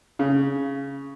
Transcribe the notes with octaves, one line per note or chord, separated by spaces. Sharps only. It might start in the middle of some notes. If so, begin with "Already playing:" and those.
C#3